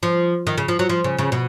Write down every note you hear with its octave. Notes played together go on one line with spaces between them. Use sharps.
F3
D#3
C#3
F3
F#3
F3
C#3
C#3
B2